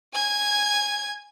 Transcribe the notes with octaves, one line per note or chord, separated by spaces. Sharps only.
G#5 G#6